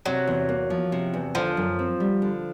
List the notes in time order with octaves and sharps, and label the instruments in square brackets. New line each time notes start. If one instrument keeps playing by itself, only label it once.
[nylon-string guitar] C3 [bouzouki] F#3
[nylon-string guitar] E2
A#3
F3
C3
E2
[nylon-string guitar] D3 [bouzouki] F3
[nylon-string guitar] F#2
C4
G3
D3